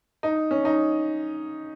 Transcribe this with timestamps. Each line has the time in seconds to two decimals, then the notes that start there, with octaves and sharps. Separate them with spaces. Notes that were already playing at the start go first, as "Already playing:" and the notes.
0.23 D#4
0.51 C#4
0.65 D#4